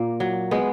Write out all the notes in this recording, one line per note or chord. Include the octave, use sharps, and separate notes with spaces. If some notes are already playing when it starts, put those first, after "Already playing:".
Already playing: A#2 A#3
F#3
G#3 B3